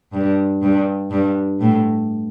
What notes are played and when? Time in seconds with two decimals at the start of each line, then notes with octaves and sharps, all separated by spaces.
0.13 G2
0.62 G2
1.11 G2
1.60 A2